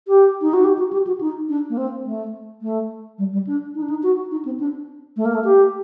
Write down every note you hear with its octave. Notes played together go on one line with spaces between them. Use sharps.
G4
D#4
F#4
G4
F#4
G4
F#4
D#4
D4
A#3
C4
A3
A3
G3
G3
D4
D#4
D4
D#4
F#4
D#4
C4
D4
A3
A#3
A3
G4